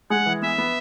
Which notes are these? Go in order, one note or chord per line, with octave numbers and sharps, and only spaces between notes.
G#3 F#5
E3
B3 E5
B3